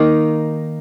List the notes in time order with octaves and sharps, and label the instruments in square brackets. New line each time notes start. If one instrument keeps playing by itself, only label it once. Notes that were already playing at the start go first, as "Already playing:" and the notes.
Already playing: [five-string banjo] D#3 A#3 D#4